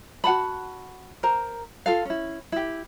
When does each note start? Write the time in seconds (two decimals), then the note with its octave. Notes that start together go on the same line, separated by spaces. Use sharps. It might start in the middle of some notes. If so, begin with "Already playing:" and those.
0.24 F#4 F#5 A5 B5
1.23 A#4 C5 A#5
1.86 F4 A4 F5
2.05 C#4 E4
2.52 E4 G4